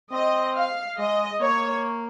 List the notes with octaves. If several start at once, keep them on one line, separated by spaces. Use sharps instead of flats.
C4 D#5
F5
G#3 D#5
A#3 C#5